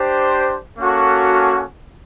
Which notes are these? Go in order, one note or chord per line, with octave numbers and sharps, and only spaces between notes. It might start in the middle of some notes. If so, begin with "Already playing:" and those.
Already playing: D4 G4 C5
A#3 C#4 F#4 A4